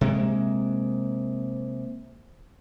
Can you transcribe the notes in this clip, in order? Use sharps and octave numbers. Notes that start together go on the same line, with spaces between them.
C3 G#3 A#3